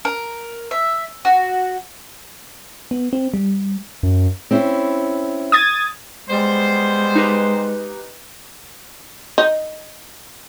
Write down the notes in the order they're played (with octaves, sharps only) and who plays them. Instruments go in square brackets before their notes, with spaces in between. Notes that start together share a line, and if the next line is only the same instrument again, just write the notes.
[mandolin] A#4
E5
F#4
[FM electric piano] B3
C4
G3
[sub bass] F#2
[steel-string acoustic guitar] C4 C#4 E4
[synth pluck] D#6 G#6 A6
[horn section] G3 B3 C5 [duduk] G#3
[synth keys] D#4 G4 B4
[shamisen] D#4